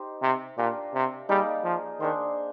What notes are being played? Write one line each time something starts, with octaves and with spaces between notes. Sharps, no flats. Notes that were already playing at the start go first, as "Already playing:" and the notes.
Already playing: D#4 G4 C5
C3
A#2 D4 G4 A#4 F5
C3
G3 A#3 D#4 G#4 D5
F3
D#3 D4 G#4 C5